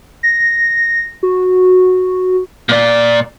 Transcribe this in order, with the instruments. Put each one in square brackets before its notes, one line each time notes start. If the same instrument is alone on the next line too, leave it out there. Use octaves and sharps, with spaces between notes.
[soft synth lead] A#6
F#4
[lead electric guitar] A#2 D5